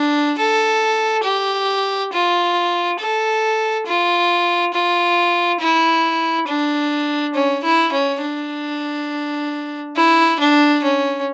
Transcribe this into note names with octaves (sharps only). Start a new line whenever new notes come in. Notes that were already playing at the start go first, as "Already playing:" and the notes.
Already playing: D4
A4
G4
F4
A4
F4
F4
E4
D4
C#4
E4
C#4
D4
E4
D4
C#4